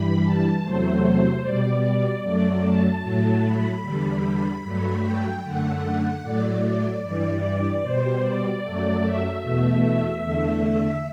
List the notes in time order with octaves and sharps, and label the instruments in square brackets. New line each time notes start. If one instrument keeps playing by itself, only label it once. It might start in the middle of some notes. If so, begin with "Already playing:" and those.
Already playing: [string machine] G2 E3 G3 B5
A5
E2 C3 F#3 A3 C5
B2 G3 D5
F#2 F#3 A3 D5
A5
A2 F#3 A3
B5
E2 D3 G3
G2 F#3 A3
G5
F#2 D3 A3 F#5
A2 F#3 A3 D5
D5
G2 E3 G3 D5
B2 G3 C5
D5
F#2 F#3 A3
E5
E2 B2 A3
E5
E2 D3 A3
E5